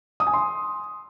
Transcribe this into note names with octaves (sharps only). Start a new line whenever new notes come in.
D#6
G#5
C6